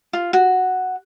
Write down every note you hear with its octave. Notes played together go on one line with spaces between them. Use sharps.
F4
F#4